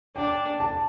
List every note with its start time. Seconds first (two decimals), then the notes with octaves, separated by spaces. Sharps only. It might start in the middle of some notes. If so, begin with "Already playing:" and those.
0.16 D4 G5
0.60 A5